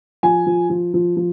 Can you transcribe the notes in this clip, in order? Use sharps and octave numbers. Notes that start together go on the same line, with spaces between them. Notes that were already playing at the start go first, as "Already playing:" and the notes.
F3 G#5
F3
F3
F3
F3